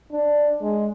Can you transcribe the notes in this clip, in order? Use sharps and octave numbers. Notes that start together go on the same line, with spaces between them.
D4
G#3